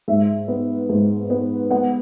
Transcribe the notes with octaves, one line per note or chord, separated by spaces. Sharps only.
G#2 E5
B3
G#2
B3
B3 F#5